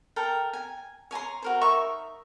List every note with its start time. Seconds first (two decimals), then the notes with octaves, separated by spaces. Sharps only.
0.16 A4 A#4 G5
0.53 G#5
1.11 C#5 G#5 A#5 C6
1.42 F#4 A#4 C5
1.61 D#4 A#4 E5 C#6